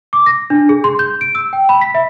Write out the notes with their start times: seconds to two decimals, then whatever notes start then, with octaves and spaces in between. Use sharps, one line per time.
0.13 D6
0.26 A#6
0.50 D4
0.69 G#4
0.84 C6
0.99 G6
1.21 D7
1.35 E6
1.53 G5
1.69 B5
1.81 B6
1.95 E5